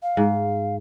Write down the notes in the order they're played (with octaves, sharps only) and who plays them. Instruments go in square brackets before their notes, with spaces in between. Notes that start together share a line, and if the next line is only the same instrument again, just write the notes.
[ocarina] F5
[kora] G#2